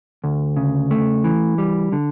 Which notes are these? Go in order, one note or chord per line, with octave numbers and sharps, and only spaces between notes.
D2
C#3
A3
E3
G3
D3